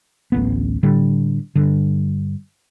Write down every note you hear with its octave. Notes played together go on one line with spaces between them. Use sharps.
D1 A1 B3
A2 D3 G3
G2 D3